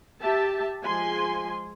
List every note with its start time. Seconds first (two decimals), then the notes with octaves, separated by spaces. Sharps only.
0.22 G4 E5 A5
0.84 F3 G#3 G#5 C6